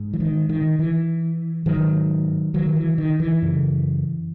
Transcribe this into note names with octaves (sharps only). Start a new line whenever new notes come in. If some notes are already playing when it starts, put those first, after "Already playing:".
Already playing: G#2
E3
D#3
D#3
E3
G#2 D#3 F#3
D#3 F#3
E3
D#3
E3
F#2 C#3